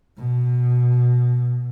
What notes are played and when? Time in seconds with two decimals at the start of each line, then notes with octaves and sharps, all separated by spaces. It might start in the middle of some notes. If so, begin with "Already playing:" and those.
0.18 B2